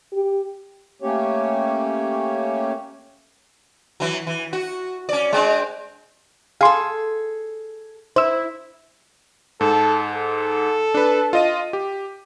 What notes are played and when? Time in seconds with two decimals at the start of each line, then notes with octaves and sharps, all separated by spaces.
0.13 G4
1.02 A3 A#3 C#4 G4 C#5
4.00 E3 F#3
4.27 E3
4.53 F#4
5.09 C#4 D5
5.32 G#3 C4 D4
6.61 G#4 A4 F5 C6
8.16 E4 C5 E6
9.61 G#2 A4
10.15 A4
10.94 D4 B4
11.33 F4 D#5 D#7
11.73 G4